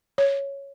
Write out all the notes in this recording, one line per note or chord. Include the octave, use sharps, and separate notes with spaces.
C#5